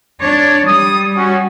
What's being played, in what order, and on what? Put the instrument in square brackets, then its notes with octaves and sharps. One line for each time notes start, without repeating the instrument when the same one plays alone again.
[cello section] D4 C#5 D5
[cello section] G3 [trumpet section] D#6
[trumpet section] C#4 F#4